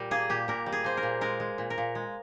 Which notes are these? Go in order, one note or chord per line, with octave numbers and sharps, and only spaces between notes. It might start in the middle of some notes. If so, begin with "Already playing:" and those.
Already playing: A#2 G3 A#4
A#3 G#4
A#2 G4
A#2 A#4
G3
G#4
A#3 C5
A#4
A#2
G#3 A#4
G#3
A#2
A#4
A#2
G#3